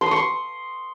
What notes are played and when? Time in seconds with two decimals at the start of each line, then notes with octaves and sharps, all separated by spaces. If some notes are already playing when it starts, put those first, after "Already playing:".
0.01 C6
0.06 D#6
0.11 C#6
0.16 C6